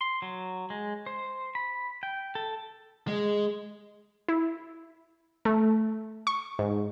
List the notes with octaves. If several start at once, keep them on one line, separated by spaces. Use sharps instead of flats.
C6
F#3
G#3
C5
B5
G5
A4
G#3
E4
A3
C#6
G#2